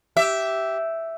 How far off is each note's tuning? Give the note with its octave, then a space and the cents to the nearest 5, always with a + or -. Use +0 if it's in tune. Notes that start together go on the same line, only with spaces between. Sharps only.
G4 -15 E5 +0